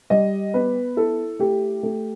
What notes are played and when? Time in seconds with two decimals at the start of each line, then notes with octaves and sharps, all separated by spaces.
0.10 G3 D#5
0.54 B3 B4
0.96 E4 A4
1.39 A3 G4
1.83 A3